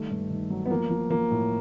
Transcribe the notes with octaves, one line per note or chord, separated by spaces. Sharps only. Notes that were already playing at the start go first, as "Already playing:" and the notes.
Already playing: D#3 G3 A3
G2
D#3
F#3
B3
F3 A#3
F3
F3 A#3
A2